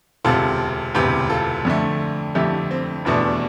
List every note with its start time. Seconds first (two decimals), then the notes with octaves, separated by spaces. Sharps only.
0.24 E1 D2 C3 F4 A4
0.95 E1 D2 C3 G4 B4
1.30 F4 A4
1.65 F2 D3 A3
2.35 F2 D3 A3 E4 G4
2.71 C4
3.05 F1 E2 B2 A3 B3 D4